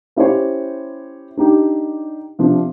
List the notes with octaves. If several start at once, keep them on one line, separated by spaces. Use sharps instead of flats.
C#4 E4 G4 C5 C#5
D4 D#4 G4
C3 F3 D4